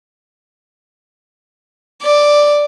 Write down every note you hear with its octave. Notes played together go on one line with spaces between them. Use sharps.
D5